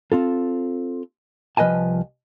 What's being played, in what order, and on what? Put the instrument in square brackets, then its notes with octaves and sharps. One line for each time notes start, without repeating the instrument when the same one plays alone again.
[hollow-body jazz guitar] C4 F4 A4
C2 F3 B4 D#5 G#5 A5